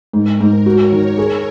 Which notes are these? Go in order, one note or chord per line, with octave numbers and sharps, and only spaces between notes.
G#2 A#4
G#2
F#4 C#5
D#3
G#4